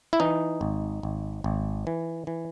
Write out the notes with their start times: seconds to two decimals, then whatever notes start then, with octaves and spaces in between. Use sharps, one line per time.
0.13 E4
0.20 E3 D#4
0.61 G#1
1.03 G#1
1.44 G#1
1.87 E3
2.27 E3